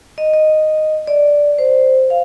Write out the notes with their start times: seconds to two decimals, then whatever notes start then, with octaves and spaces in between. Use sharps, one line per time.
0.18 D#5
0.34 D#5
1.07 D5
1.58 C5
2.10 F5